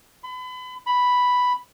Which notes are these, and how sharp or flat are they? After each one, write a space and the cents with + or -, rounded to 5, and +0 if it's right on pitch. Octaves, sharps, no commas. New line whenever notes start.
B5 +35
B5 +0